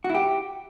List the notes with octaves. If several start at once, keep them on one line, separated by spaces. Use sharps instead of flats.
F#4
E4
G4